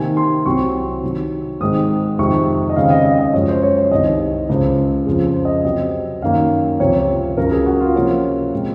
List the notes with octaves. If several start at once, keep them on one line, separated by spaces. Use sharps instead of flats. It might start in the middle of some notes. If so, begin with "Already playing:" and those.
Already playing: C3 D#3 A#3 G#5
C6
C2 C3 F#3 C4 C#6
C3 D#3 F#3
G#2 D#3 G#3 C4 D#6
F2 C3 D#3 G#3 C4 C#6
D#5
D#2 C#3 G#3 C4 F5
D#5
D#5
D#5
F#2 F3 G#3 C#5
C5
C#5
C#5
C2 C3 D#3 D#5
C#2 C#3 G#3 C5
F2 C#3 F3 G#4
C5
D#5
C3 F#3 C4 D#5
F#2 D#3 A#3 F5
C#2 C3 F3 C4 C#5
C#2 C#3 F#3 A#4
G#4
F#4
F4
C3 F3 A#3 C#4
A#2 G#3 C4